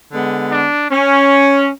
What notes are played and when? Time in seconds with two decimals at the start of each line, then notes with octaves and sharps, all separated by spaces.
0.10 D3 G#3 B3
0.50 D4
0.90 C#4